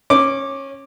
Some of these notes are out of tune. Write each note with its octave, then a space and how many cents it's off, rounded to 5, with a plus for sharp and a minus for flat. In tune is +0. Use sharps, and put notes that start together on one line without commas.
C#4 -20 D6 +0